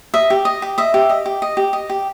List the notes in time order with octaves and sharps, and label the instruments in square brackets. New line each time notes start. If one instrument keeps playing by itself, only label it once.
[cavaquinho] D#5 E5
G4
D#5
G4
D#5 E5
G4
D#5
G4
D#5
G4
D#5
G4